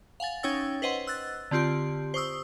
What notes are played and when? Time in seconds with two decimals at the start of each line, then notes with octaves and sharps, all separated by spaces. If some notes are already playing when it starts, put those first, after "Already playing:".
0.20 F5 F#5 G#5 A6
0.43 C#4 D#4 C#5 G5 E6 A6
0.82 B4 C5 D#5 F#5 C6
1.07 E6 F#6 A6
1.51 D3 C4 F4 G4 C6
2.14 C5 C#6 D#6 E6